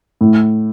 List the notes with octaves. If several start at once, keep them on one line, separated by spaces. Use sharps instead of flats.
A2